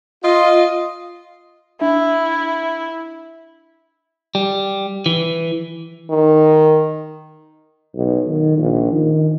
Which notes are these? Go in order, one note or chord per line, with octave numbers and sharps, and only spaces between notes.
F4 D#5
D4 E4 E5
G3
E3
D#3
B1
D#3
A#1
D#3